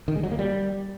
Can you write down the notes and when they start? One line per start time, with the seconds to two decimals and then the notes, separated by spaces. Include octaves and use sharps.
0.08 D#3
0.16 G#3
0.23 F#3
0.31 A#3
0.39 G3